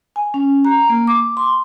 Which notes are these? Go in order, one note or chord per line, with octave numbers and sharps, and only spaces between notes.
G#5
C#4
A#5
A#3
D6
C6